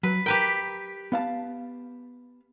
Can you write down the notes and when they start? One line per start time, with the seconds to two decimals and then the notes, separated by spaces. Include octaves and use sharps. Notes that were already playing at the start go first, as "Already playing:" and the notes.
0.03 F#3 B4
0.26 G4 A#4 B4 G5
1.12 B3 F5 A5